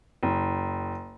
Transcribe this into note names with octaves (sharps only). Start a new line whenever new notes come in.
F#1